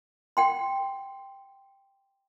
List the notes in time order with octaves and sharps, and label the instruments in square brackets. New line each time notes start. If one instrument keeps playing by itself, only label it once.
[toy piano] F#5 G5 C6